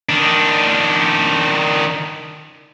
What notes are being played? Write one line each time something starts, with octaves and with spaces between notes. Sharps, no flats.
D#3 D4